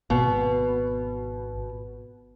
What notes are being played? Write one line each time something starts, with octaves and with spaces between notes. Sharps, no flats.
G#1 B2